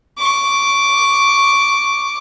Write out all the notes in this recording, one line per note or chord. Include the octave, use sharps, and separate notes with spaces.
C#6 D6